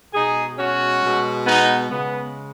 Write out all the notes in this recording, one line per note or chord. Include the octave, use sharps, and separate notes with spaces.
B2 G#3 D#4 G#4
C#4 F#4
B2 G#3
B3 D#4
C#3 G#3 B3